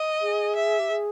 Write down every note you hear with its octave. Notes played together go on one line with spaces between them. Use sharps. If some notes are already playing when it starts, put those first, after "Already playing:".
Already playing: D#5
G#4
E5
G4
G#4